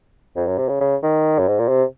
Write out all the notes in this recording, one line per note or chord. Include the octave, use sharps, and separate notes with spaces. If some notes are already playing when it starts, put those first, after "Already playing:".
F2
F#2
C3
C#3
C#3
D#3
F#2
G#2
A#2
C3